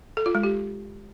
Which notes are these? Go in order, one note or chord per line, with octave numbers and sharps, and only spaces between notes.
A4
F4
G#3
G4